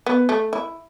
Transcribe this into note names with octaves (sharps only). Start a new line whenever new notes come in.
B3
A3
E4